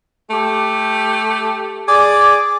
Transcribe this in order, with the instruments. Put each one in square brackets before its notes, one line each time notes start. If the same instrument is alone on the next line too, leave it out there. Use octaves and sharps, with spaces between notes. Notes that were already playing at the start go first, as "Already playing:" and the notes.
[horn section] A3 G4
G#4 D5